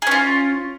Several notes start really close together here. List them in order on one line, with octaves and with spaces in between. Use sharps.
G#4 C#4 F4